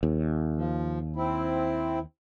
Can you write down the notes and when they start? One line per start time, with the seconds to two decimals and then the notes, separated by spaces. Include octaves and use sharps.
0.03 D#2
0.56 F3
1.16 C4 E4